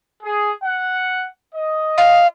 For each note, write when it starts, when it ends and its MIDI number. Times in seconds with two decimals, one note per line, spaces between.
0.24 0.52 68
0.65 1.29 78
1.55 2.24 75
1.98 2.27 77